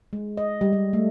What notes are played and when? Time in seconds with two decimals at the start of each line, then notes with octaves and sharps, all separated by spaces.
0.13 G#3
0.37 D#5
0.61 G3
0.73 G3
0.93 A3